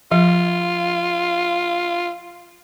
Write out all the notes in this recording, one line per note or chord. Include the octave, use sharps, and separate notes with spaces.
F3 F4